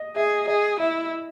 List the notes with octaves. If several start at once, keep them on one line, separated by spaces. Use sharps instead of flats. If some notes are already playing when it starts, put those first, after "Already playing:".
Already playing: D#5
G#4 E5
G#4 D#5
E4 E5